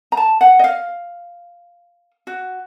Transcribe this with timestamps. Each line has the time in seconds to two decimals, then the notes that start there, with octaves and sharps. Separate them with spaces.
0.12 A#5
0.17 A5
0.41 F#5
0.59 D#5
0.64 F5
2.27 F#4